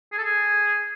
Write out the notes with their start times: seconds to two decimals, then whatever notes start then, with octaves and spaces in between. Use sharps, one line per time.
0.12 G#4
0.18 A4
0.23 G#4